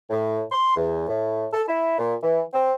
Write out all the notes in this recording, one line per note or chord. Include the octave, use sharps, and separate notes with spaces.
A2
C6
E2
A2
A4
E4
A#2
E3
C4